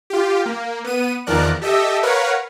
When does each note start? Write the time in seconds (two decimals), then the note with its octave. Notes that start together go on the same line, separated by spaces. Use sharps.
0.10 F4 G4
0.46 A#3
0.84 B3 D#7
1.26 E2 D#3 F3 A#4 D5 F#6
1.61 G4 A4 D#5 E5
2.03 A#4 B4 C#5 F5 F#5